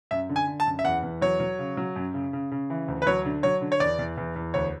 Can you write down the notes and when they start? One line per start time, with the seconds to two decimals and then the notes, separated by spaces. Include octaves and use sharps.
0.11 F#2 E5
0.29 D3
0.36 G#5
0.47 D3
0.60 A5
0.67 F#2
0.79 E5
0.84 E2 F#5
1.03 E2
1.22 F#3 C#5
1.40 F#3
1.59 C#3
1.77 F#3
1.96 F#2
2.14 C#3
2.33 C#3
2.51 C#3
2.70 E3
2.88 D2
3.02 B4
3.06 F#3 C#5
3.25 D3
3.43 F#3 C#5
3.61 D3
3.72 C#5
3.80 E2 D5
3.99 E2
4.17 E2
4.36 E2
4.54 D2 C#5